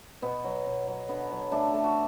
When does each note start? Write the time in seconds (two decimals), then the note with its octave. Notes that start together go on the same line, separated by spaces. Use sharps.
0.22 B2 B3
0.44 F#3
0.66 B2
0.87 F#3
1.09 D3 B3
1.31 F#3
1.52 A3 D4
1.74 A3
1.84 F#4